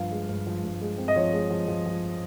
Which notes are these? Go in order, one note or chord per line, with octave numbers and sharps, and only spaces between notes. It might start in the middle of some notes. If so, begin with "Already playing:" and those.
Already playing: G2 F3 F5
G#3
G2
F3
G2
G#3
C4
D#5
F3 C#5
G#3
F3
F3
F3